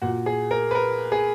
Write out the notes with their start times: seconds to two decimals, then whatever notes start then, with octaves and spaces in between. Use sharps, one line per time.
0.02 A#2 F#4
0.26 G#4
0.51 A#4
0.71 B4
0.75 A#4
1.12 G#4